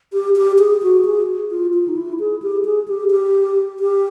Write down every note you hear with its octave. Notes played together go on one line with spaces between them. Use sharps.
G4
G4
G#4
F#4
G#4
F4
F4
D#4
E4
G#4
G4
G#4
G4
G4
G4